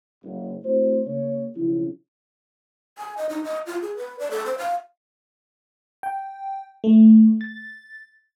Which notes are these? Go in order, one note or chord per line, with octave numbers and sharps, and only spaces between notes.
F#1
A3 C4 E4 F#4 C5
C#3 A#3 C#5
B1 C#3 F3 C#4 E4
G#5
D#5
D#4
D#5
F4
G#4
B4
D5
A4
C5
F5
G5
A3
A6